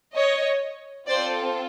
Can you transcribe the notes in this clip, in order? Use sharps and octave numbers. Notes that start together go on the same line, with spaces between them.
C#5 D#5
C4 F4 A4 C5 D5